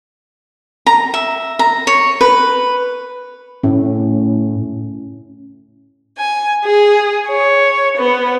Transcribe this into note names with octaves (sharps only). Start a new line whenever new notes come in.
A#5
E5
A#5
C#5
B4
A2 C#4
G#5
G#4
C#5
B3